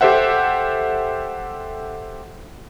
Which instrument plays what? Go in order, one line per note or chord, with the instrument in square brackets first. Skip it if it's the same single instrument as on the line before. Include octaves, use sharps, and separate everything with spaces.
[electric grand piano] G4 A4 C5 E5 F#5